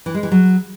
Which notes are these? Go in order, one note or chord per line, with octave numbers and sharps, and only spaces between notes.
E3
G#3
E3
F#3